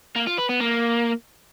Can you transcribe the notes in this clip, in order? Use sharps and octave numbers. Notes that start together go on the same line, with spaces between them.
A#3
F4
B4
B3
A#3